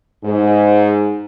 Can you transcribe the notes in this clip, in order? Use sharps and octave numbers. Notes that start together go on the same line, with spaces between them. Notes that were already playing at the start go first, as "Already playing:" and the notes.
G#2